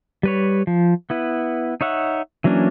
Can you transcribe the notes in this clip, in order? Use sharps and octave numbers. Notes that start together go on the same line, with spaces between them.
G3 B4 C#5
F3
B3 E4 B4
D#4 C#5 E5 F#5
E3 F#3 A#3 C#4 D4